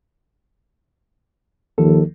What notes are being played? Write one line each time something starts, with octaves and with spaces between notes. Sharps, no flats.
D#2 D#3 F3 A4